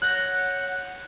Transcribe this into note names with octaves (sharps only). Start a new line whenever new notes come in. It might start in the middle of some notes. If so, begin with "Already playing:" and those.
C#5 F#5 F#6 G6 A#6